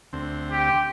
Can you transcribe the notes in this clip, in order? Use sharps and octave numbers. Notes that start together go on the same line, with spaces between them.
D2 C4
G4